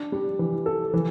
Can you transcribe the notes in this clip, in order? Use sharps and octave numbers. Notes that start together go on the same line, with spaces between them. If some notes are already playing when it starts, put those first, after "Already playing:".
Already playing: D4
G3
E3
A4
E3